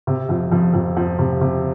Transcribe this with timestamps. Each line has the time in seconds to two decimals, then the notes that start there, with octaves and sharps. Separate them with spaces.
0.07 C3
0.29 F2 F3
0.52 F2 F3
0.74 F2 F3
0.97 F2 F3
1.19 C3
1.41 C3